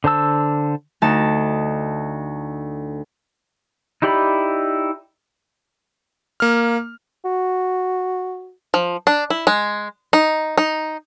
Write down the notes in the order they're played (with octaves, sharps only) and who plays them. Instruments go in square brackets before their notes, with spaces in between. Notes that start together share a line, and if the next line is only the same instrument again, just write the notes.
[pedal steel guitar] D3 C5 A5 E6
[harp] D2 D#4 A5
[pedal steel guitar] D#4 E4 G4 D5 B5
[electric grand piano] A#3 F6
[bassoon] F#4
[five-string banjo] F3
D4
E4
G#3
D#4
D#4